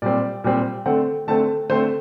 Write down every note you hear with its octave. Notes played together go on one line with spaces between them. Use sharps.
A#2 G3 C4 D5
A#2 G3 C4
D3 A3 C4 F#5
D3 A3 C4 A5
D3 A3 C4 C5